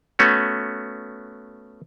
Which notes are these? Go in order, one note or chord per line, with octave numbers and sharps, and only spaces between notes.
A3 B3 C#4 F#4